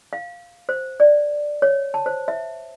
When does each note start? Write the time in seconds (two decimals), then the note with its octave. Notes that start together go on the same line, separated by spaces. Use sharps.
0.13 F5
0.69 C5
1.00 D5
1.62 C#5
1.94 A5
2.06 C5
2.28 E5